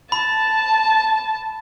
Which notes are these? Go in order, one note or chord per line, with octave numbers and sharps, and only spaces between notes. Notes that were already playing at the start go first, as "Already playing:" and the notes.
A5 B5